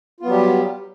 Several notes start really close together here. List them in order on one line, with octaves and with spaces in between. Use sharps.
F4 B3 F#3 G3 G4